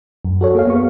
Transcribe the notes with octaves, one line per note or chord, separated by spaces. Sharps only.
F#2
F#4 A4 C#5
A#3 G#4 F5
B3 C#6